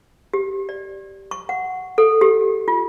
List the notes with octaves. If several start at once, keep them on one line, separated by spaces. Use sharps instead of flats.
G4
D5
C#6
F#5
A4
G4
F4